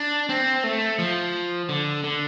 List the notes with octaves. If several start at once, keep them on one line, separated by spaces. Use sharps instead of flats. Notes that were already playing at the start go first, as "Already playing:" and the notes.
Already playing: D4
C4
A3
F3
D3
D3